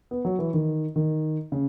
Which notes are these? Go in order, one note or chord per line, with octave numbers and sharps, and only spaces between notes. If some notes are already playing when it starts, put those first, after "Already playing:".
B3
F#3
E3
D#3
D#3
C#3